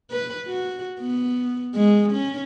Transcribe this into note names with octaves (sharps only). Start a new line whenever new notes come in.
B4
F#4
B3
G#3
C#4